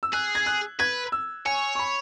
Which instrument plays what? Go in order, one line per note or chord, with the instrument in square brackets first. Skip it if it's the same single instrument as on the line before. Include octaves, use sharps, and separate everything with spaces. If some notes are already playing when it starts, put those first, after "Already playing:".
[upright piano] E6
[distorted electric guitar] G#4 [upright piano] F#6
[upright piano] G#6
F#6
[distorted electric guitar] B4 [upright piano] G#6
[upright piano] E6
[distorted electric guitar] C#5 [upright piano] G#5
[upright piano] C#6
B5